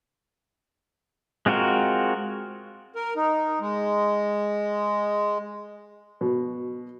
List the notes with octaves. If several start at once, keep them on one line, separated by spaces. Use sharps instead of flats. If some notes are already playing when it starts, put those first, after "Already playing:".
G#3 C4 F4 F#4 A#4
A#4
D#4
G#3
B2